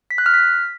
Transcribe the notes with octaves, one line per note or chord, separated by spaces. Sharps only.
B6
F#6
F6
B6